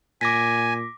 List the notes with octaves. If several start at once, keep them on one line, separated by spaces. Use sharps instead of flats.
A#2 G#5 D6 A#6 B6